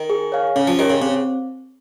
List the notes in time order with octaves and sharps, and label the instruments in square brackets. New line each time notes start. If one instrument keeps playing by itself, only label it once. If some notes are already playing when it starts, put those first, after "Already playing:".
Already playing: [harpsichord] D#3
[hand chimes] G#4
C#5 F5 G#5
[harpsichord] C#3 [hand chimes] C#4
[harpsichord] F3
[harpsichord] D#3 [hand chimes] G4 C#5
[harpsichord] C#3
[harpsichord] C#3 [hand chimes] C4